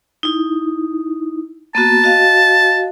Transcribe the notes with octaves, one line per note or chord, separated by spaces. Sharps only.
D#4 E4
A#3 B3 F#4 A5
F#4 D#5 F5